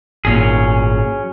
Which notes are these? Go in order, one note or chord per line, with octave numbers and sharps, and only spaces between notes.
G#1 A#2 F#3 C#4 G#4